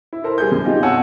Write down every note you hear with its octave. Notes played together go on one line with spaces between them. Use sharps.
E4
A4 A#4 C5
G3 G#4 G6
F#2
C4 D#4 F4 G4
B2 C#5 F#5 G#5 A5 E6